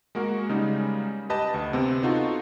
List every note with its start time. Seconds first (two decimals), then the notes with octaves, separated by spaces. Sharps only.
0.15 G#3 A#3 F#4 A#4
0.49 C#3 G3 G#3 D#4
1.30 G4 B4 D#5 A5
1.54 D2
1.73 C3 B3 C4
2.03 D#4 F4 F#4 A4